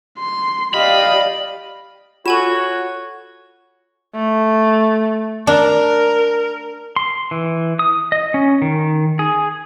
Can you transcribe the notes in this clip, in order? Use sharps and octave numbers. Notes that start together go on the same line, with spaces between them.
C6
G4 D5 D#5 F5 B5
F4 F#4 A4 C#5 G#5 E7
A3
D4 A#4
C6
E3
D#6
D#5
C#4
D#3
G#4